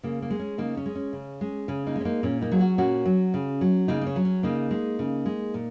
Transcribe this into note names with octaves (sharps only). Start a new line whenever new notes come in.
C#3 A#3
A#3
G#3
C#4
C#3 A#3 D#4
C#4
G#3
C#4
C#3
G#3
C#3 C#4
A#3 D#4
G#3
C#4
A#3 D#4
A#2 C#4
A#3 D#4
F#3 G#4
C#4 F#4
A#2 C#4 F#4
F#3
C#3
F#3
C#3 A#3 D#4
A#3
C#4
F#3
C#4
C#3 A#3 D#4
G#3
C#3
G#3
A#2